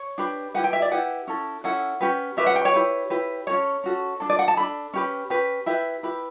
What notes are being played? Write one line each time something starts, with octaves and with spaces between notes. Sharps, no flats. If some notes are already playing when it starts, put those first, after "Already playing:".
Already playing: C#5
D4 G4 B4
E4 G4 B4 F#5
G5
E5
D5
E4 G4 B4 F#5
C#4 E4 A4
C#4 E4 A4 F#5
C#4 G4 B4
C#4 G4 B4 E5
F#5
G5
C#5
E4 G4 B4
E4 G4 B4
C#4 F#4 A4 C#5
C#4 F#4 A4
D4 A4
D5
F#5
A5
D4 A4 B5
C#4 G4 B4
C#4 G4 B4
E4 G4 B4 E5
E4 G4 B4